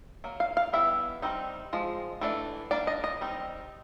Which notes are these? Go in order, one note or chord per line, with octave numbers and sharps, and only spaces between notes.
F#3 A#3
F5
F5
E3 G3 B3 E4 E5
G3 C4 D#4
F3 G#3
E3 A3 D4
G3 A#3 D4 D5
D#5
D#5
G3 C4 D#4